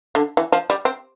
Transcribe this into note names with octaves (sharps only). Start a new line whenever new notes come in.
D3
E3
F3
G3
C4